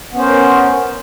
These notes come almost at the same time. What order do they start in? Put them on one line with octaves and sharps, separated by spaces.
B3 C#4 C5 A#4